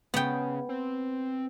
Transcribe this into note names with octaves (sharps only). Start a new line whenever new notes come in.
C#3 B3 G5
C4